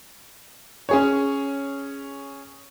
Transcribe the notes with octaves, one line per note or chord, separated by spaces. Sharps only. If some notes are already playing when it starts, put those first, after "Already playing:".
C#4 G#4 C#5